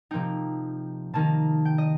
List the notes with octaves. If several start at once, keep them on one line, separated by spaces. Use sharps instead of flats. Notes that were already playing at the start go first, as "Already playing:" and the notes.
C3 F3 A#3 D#4 G5
C3 D#3 A#3 D#4 A5
G5
D#5